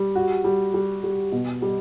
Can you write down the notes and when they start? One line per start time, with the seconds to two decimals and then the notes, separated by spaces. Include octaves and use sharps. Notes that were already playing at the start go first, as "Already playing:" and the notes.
Already playing: G3
0.15 F#4
0.44 G3
0.74 G3
1.04 G3
1.32 B2
1.62 G3